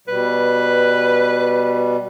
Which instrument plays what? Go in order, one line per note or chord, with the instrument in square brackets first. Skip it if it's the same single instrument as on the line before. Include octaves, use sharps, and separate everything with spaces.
[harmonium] B2 G3 [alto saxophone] B4